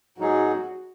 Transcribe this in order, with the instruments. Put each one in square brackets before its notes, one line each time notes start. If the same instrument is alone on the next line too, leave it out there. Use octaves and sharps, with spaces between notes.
[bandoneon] G#2 F#3 D#4 G#4 [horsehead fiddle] F#4